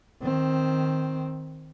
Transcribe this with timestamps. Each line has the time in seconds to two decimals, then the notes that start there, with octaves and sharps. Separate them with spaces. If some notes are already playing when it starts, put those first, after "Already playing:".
0.22 D#3 C4